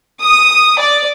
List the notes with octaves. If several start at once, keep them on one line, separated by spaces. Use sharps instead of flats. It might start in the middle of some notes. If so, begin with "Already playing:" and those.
D#6
D5